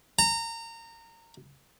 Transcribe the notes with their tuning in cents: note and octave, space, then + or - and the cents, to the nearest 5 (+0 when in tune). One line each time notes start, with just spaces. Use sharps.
A#5 -25